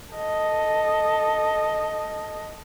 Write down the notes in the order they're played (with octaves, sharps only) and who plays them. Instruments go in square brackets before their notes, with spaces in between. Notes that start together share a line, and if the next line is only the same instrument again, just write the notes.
[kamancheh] A4 D#5